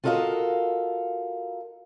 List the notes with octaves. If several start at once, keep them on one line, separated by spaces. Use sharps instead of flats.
F4 F#4 A4 A#4 D#5 F5